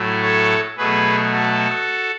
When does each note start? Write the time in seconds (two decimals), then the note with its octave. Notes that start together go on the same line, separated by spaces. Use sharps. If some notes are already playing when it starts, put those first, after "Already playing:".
Already playing: A2 F#3 A3
0.22 A4 C#5
0.77 B2 F#3 A3 G#4 B4
1.33 F#4 A4